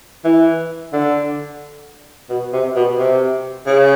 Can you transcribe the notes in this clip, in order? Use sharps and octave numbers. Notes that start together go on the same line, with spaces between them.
E3
D3
B2
C3
B2
C3
C#3